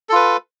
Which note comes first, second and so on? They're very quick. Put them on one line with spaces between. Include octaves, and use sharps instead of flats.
A4 F4 B4